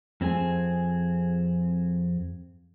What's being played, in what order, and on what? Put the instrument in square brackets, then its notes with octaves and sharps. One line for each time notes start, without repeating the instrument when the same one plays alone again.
[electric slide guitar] F2 C4 G#4 G#5